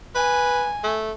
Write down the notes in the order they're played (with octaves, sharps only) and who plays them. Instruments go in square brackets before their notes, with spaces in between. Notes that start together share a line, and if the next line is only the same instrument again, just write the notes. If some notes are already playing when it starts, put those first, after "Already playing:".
[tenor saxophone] B4 [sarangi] G#5
[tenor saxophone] A3